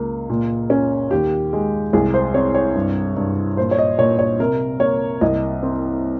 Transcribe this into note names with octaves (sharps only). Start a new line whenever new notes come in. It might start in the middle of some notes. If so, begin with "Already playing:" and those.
Already playing: C#2 A#3
A#2
C#4
D#2 G4
G#3
C2 G#4
C5
C4 C#5
C#5
G2
G2
A#2 C5
C#5
D#5
A#2 C#5
C#5
C3 A#4
A#3 C#5
C2 D#5
C4